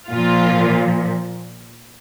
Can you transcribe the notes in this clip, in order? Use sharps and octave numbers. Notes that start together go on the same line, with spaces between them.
A#2 F3 F4